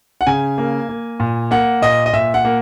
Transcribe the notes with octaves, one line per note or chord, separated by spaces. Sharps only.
F#5
C#3 G#5
A#3
A#3
A#2
A#3 F#5
A#2 D#5
D#5
A#2 E5
F#5
A#3